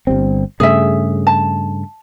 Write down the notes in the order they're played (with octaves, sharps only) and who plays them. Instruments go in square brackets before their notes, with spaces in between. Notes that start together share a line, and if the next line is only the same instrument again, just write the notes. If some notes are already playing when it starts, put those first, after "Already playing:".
[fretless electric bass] G1 G3 C4
[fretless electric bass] G2 C#3 A3 [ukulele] G#4 E5
[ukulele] A5